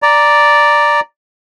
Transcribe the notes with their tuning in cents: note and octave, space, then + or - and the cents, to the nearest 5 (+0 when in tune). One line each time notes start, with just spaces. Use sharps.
D5 +0 A#5 +0